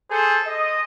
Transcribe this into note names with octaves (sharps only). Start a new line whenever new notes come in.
G#4 A4 C5
D#5